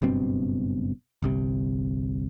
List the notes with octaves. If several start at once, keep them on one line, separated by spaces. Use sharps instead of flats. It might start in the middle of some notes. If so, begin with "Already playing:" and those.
F#1 G2 B2 C4
G1 C2 C3